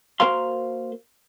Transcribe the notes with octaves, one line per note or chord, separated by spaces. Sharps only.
A#3 F#4 A#4 C5 F5 C6